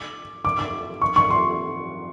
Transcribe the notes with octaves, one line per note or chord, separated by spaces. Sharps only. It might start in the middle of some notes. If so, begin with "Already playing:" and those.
Already playing: D6
D6
D6
C#6
C#6
C6